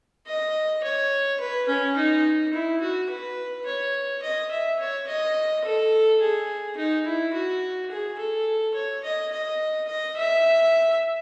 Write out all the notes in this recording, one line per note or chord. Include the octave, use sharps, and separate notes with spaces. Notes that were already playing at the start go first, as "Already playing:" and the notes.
D#5
C#5
B4
C#4
D#4
E4
F#4
B4
C#5
D#5
E5
C#5
D#5
A4
G#4
D#4
E4
F#4
G#4
A4
C#5
D#5
D#5
D#5
E5